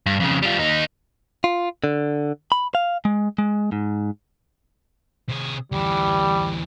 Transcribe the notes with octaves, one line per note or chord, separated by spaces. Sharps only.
G2
F2 C#3
G3 F4
D#2 D#4
F4
D3
B5
F5
G#3
G#3
G#2
C3 G#4
D2 E3 G3